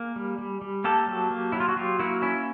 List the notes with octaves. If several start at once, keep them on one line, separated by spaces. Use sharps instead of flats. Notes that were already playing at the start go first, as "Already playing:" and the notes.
Already playing: A#3 G#4
G3
G3
G3
A#3 G4 A4
F#3
A#3
F#3 E4
F4
F#4
F#3 F4 G4
A#3 E4 F#4
C#4 E4